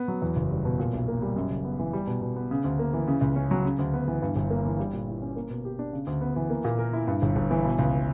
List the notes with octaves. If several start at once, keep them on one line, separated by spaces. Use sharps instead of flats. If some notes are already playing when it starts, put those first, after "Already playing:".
Already playing: B3
F#3
E2
F#1
G3
B2
A#2
B1
A#3
G3
F#2
F#1
B3
E3
G3
B2
B2
B3
C#3
D2
A#3
E3
C#3
C#2
C#4
F#3
C#3
D2
B3
E3
G2
G1
A#3
E3
G3
A#2
E4
C#4
A#3
B2
G4
D4
C#3
D2
B3
E3
A#3
A#2
A#4
E4
G2
G1
G1
E3
B2
C#2